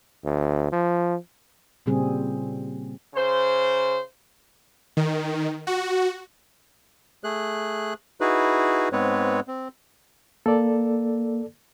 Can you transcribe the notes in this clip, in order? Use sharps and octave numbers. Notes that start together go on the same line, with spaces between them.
D2
F3
A#2 C#3 G3 C4 G#4
C#3 C5
D#3
F#4
A3 G#4 F#6
D#4 E4 F#4 G#4 B4
G#2 G#3 B3 C4 B4 C#5
C4
A#3 A4 D5